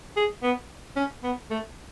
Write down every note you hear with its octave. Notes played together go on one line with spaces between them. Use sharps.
G#4
B3
C#4
B3
A3